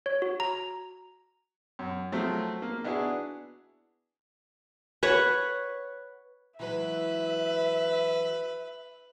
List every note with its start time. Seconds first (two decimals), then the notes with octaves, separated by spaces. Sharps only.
0.06 C#5
0.22 F#4
0.40 A#5
1.79 F#2
2.12 F3 F#3 A3 C4
2.62 A#3
2.84 B3 D4 E4 F#4 G#4
5.03 B4 C#5 F#5
6.60 E3 F#3 G#3 B4 E5